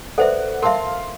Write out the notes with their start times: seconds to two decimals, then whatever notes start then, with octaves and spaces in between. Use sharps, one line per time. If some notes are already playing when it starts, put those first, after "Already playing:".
0.18 A4 B4 C5 D5 E5 F#5
0.63 A#4 E5 F5 A5 C6